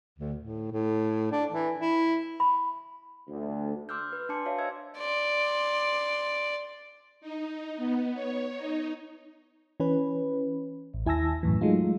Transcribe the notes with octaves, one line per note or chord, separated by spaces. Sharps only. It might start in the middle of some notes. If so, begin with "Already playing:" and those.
D2
A2
A2
D4
E3
E4
B5
D2
C6 D6 E6 F6 G6
B4
D4 A5 C6 D6 C#7
F#4 C#5 E5 F5
C5 D#5 E5 E6 G#6 C#7
D5 C6
D#4
B3
C#5
D#4
E3 C#4 B4
A1
D#2 E4 G#5 A5 E6 A#6
F#2 A2 E3
F#3 G#3 A3 D#4 F4